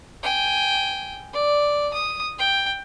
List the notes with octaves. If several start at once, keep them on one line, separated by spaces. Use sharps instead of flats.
G5 G#5
D5
D#6
G5